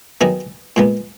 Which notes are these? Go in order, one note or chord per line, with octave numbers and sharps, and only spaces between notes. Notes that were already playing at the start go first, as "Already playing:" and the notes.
D#3 F#3 B3 D#4 G#4
A#2 G#3 B3